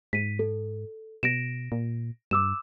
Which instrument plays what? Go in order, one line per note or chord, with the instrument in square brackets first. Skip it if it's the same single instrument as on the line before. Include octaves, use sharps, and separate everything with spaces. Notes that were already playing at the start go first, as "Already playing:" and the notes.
[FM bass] G#2 [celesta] B6 D#7
[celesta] A4
[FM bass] B2 [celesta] A#6 D7 E7
[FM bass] A#2
[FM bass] G2 [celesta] D6 E6 E7